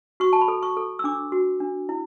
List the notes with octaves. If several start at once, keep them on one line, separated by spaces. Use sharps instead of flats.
F#4 C#6
A5
B5
A4
C#6
A4
E6
D4 D6
F#4
D4
E4